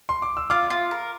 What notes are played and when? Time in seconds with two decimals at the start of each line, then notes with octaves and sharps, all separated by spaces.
0.09 C6
0.22 D6
0.37 E6
0.50 F4 D6 F6
0.70 F4
0.91 A#4